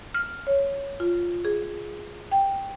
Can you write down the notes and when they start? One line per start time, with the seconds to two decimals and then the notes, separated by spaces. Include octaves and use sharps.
0.14 F6
0.47 C#5
1.00 F4
1.45 G#4
2.32 G5